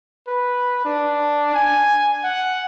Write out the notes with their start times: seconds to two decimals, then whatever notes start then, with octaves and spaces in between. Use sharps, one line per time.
0.27 B4
0.85 D4
1.54 G#5
2.24 F#5